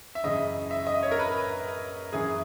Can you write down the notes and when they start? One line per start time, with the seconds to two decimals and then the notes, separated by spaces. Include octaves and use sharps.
0.15 E5
0.23 F#2 C#3 E3 D#5
0.71 E5
0.87 D#5
1.03 C#5
1.11 A#4
1.19 B4
2.13 F#2 E3 G#4